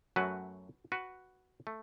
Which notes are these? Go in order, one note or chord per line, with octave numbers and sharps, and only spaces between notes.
F#2 F#3 A3 F#4 B4
F#4 B4
A3